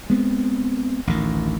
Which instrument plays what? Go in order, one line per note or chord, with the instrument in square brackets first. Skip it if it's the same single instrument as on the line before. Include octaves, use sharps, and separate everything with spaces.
[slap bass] G#3 B3 C4
A1 D2 D#3